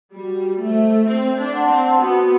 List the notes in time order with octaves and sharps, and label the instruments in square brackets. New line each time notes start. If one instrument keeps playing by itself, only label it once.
[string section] G3 [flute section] F#4
[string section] A3 [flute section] A4 C5 E5
[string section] C4 [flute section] C5
[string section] D4
[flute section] F#5 A5 C6
[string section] C4
[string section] B3 [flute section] F#4